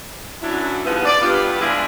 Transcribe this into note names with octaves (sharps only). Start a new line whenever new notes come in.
F#2 F#3 D4 E4
D#2 F3 G#3 B3
D5
G2 B3 F4
E3 F3 G#3 D4 E4 G#4